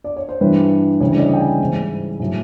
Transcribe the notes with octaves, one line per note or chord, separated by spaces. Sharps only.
D5
C#5
C5
G2 E3 G3 B4
D2 C#3 E3 G3 C#5
D5
D#5
G5
G#5
G#2 E3 G3
A2 F#3